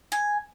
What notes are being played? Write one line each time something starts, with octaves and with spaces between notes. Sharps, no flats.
G#5